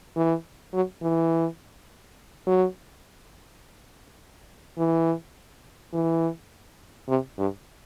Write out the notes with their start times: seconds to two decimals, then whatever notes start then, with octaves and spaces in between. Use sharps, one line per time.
0.16 E3
0.74 F#3
1.03 E3
2.47 F#3
4.78 E3
5.94 E3
7.09 C3
7.38 G2